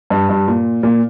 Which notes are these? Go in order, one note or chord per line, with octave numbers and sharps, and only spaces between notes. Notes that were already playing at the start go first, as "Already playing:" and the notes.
G2
G2
A#2
A#2